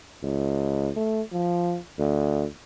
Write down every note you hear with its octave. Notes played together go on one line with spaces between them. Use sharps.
C#2
A3
F3
D2